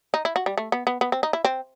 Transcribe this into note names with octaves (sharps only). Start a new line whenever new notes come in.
D#4
E4
F#4
G3
A3
B3
B3
B3
C4
D#4
E4
C4